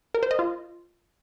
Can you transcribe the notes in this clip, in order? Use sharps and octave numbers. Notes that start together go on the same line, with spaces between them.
A#4
C5
D#5
F4